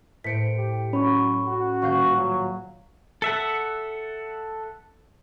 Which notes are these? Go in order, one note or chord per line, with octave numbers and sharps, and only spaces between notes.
A2 C5 B6 C#7 D7
G4
F#3 C#4 B5 C#6
F#4
D#1 F5 C#6 G6
F#3
A4 E5 F#5